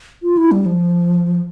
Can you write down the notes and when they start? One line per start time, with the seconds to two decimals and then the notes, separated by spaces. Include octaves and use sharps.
0.23 F4
0.37 E4
0.52 G3
0.66 F3